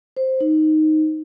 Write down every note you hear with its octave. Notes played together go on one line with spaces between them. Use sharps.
C5
D#4